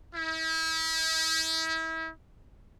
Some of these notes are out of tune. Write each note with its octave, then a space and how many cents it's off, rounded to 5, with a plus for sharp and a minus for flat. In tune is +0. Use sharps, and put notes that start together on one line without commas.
E4 -35